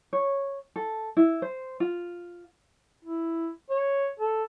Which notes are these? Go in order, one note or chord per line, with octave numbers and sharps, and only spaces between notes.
C#5
A4
E4
C5
F4
E4
C#5
A4